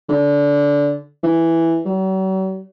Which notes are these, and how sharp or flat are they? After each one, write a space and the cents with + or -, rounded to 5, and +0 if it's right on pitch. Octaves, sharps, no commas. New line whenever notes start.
D3 -20
E3 +0
F#3 +45